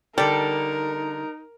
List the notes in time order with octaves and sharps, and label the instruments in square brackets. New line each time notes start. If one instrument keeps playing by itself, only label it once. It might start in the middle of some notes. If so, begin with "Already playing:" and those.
[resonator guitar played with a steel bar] D3 A4 [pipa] G3 [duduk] D#4 [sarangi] A#4